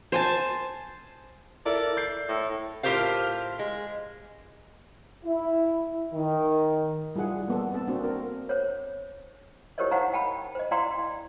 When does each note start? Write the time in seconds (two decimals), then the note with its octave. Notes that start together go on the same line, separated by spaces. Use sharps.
0.12 C5 G#5 A5
1.66 E4 A4 A#4 D5
1.97 G6 C7
2.29 A2
2.83 A2 F4 G4 A#4 C5 F5
3.59 G#3
5.24 E4
6.13 D#3
7.16 G3 E4 F4 G#4 F#5
7.48 A#3 B3 A4
7.72 B3 C4 A4 A5
7.87 A#3 C4 D4 F#4
8.04 A#4
8.49 C5 C#5
9.78 E4 G4 A#4 C5 C#5 D#5
9.91 D#4 C5 F5 F#5 A#5
10.13 G5 A5 B5
10.55 C5 D#5
10.71 E4 D5 F5 G5 A#5 C6